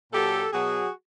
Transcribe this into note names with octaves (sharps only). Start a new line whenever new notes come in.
A#2 F#3 G4 A4
B2 F#3 F#4 G#4